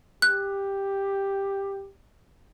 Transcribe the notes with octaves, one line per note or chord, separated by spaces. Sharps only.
G4 F#6